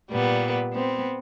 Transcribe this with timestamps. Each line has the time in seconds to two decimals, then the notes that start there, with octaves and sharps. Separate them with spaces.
0.10 A#2 G3 B3
0.73 B3 C4